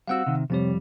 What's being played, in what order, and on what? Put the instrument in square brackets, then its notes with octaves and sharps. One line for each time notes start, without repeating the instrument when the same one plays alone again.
[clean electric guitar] G3 C4 F#4 [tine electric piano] F5 F#5 E6
[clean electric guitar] C3 D#3
[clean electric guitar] F2 G3 [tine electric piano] C3 C4 C#5